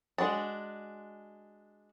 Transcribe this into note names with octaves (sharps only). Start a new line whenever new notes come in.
G#3 D4 F#4 A5